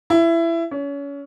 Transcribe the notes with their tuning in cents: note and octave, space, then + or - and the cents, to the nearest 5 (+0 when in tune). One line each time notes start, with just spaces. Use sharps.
E4 +20
C#4 +30